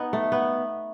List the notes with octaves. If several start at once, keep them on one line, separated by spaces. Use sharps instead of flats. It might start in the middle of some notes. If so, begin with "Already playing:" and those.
Already playing: B3 D#4
A3
B3